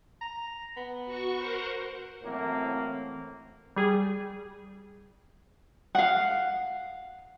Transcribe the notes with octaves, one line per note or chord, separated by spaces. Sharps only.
A#5
B3
F#4 C#6
A#4 C5 F#5
F#2 A2 E3 A3 A#3 C4
G3 G#4
F5 F#5